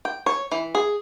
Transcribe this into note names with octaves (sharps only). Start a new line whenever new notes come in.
G5
C#5
E3
G#4